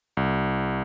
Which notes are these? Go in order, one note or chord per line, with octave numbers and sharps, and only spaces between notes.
C2